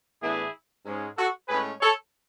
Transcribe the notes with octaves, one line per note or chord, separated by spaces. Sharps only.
A2 E3 B3 D4 E4 G#4
G#2 G#3 C#4
F#4 A4
A2 G#3 C#4 G#4 B4
A4 C#5